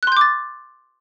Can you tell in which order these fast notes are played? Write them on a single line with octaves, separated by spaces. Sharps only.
F#6 C6 G6 D6 A6